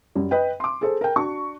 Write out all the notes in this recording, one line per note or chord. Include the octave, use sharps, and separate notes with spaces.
F#2 G3
B4 D#5 G5
C6 D6
G#4 A4 C5
A#4 G5
D4 F#4 C#6